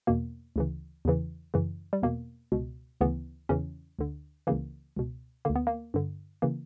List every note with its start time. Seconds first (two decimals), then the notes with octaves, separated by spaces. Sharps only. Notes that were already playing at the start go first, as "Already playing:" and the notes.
0.07 E2 B2 A#3
0.56 D2 C#3 E3
1.05 E2 C#3 E3
1.54 F#2 C#3 E3
1.93 G3
2.02 E2 B2 A#3
2.52 C#2 B2
3.01 D2 C#3 E3 B3
3.49 E2 C#3 E3 C#4
3.99 D2 D3
4.47 C#2 C#3 E3 A#3
4.97 C#2 B2
5.45 D2 D3 A#3
5.56 B3
5.67 A#3
5.94 G2 D3
6.42 C#3 E3 A#3